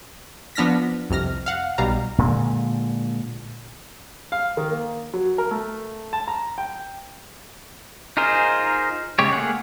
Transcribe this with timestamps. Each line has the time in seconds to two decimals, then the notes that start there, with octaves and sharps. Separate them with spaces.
0.55 F3 B3 D4 F6 A#6 B6
1.10 C2 F2 C3 F6 A#6
1.46 F5 F#5
1.78 B1 B2 G3 F5 A#5
2.18 A#2 D3 G#3
4.32 F5
4.57 D#3
4.70 A#3
5.14 F#3
5.38 A#4
5.51 A3
6.13 A5
6.28 A#5
6.58 G5
8.17 D#4 F4 G#4 A#4 C5
9.19 C#3 G#3 G4 C#5
9.32 A3 A#3 G#4 F#5